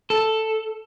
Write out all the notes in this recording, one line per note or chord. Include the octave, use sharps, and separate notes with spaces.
A4